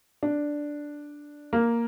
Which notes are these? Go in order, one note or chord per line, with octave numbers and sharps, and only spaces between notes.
D4
A#3